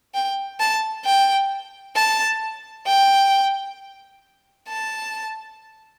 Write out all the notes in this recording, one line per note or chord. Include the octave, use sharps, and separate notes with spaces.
G5
A5
G5
A5
G5
A5